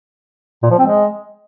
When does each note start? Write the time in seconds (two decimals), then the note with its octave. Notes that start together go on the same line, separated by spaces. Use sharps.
0.63 A#2
0.71 F3
0.79 C4
0.86 G#3